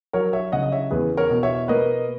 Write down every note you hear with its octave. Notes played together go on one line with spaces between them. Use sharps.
F#3 A#4 C#5
C#5 E5
C#3 D#5 F#5
D#5
C#5 E5
E2 G#4 B4
A#4 C#5
B2
C#5 E5
A#3 B4 D#5